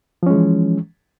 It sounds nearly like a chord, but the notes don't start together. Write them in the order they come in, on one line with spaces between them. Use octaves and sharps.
F3 C#4 G#3 E3